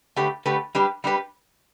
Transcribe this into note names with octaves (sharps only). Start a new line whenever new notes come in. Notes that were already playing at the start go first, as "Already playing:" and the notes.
D3 A3 G4 B4
D3 A3 G4 B4
G3 D4 G4 B4
G3 D4 G4 B4